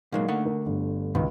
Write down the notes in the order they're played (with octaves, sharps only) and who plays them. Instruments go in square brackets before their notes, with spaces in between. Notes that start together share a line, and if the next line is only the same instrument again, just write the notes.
[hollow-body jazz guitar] A#2 F#3 G#3 [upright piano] A#3 D#4 F5
[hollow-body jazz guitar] D3 A3 F#5
[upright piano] D4 A#4
G1
[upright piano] C#2 [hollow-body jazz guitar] B2 D#3